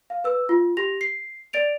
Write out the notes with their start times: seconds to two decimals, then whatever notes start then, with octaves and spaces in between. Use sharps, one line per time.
0.10 F5
0.24 B4 E6
0.49 F4
0.77 G4 A#6 F7
1.01 C7
1.53 D5 A6 D7 F7